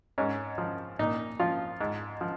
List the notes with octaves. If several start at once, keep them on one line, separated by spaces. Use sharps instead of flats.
G#2 C#4
F3
A#2 D#4
F3 F4
G#2
F3